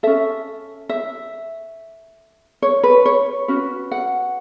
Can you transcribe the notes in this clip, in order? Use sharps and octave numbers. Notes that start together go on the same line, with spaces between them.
C#4 A4 E5
E5
C#5
B4
C#5
C#4 F#4 B4
F#5